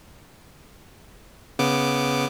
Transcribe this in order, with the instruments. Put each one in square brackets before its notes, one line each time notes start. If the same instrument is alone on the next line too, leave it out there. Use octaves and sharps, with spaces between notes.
[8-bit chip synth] C#3 B3 D6